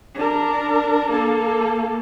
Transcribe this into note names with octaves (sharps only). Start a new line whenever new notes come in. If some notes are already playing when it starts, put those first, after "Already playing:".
D4 A#4
A#3 A4